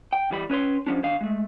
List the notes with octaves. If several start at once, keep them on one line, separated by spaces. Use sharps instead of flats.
G5
E2 E3 G3 D5 B5
C#4 B4 C#5 C6
F3 C#4 D4
D#3 D4 F5
G#3 A3